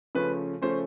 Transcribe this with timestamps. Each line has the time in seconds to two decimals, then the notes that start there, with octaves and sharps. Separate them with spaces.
0.15 C#3 F3 A3 C#4 B4
0.62 C#3 F3 A3 C#4 C5